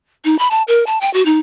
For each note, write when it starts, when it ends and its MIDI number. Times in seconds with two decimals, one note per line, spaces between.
0.25 0.36 63
0.38 0.48 83
0.51 0.62 81
0.68 0.86 70
0.86 1.01 81
1.01 1.12 79
1.13 1.25 66
1.25 1.39 63